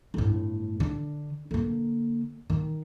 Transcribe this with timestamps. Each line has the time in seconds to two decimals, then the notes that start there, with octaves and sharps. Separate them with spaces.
0.14 G1 A2
0.80 D3
1.51 D3 A#3
2.50 D#3